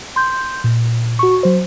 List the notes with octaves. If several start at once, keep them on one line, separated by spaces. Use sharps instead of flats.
C6 G6
A#2
F#4 C#6
F#3 C5